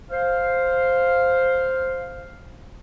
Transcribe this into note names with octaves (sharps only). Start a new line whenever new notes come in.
C5 F5